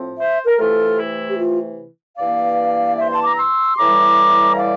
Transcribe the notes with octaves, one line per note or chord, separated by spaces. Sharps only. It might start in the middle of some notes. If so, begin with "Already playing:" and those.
Already playing: A2 F3 C4
C5 E5
A#4
C3 E3 A3 F4 A4
E4
G4
F4
G2 E3 A#3 D5 F5
C5 E5
A5 C6
A#5 D6
C6 E6
A2 E3 G3 A#5 D6
D5 F5